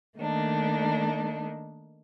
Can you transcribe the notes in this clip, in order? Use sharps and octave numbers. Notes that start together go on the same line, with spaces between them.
D#3 A3 A#3 D4 D#4